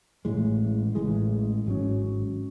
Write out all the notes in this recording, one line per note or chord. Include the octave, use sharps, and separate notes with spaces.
A1 A2 E3 G#3
A1 A2 E3 G#3
G#1 G#2 F#3 C#4